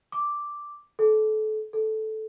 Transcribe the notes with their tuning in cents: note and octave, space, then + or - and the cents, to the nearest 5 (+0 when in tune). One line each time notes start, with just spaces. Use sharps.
D6 +0
A4 -30
A4 -10